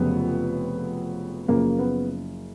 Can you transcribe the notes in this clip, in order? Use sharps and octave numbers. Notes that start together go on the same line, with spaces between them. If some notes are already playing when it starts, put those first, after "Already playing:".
Already playing: F1 F2 C#3 F#3 B3
F#1 F#2 C#3 F3 A#3
B3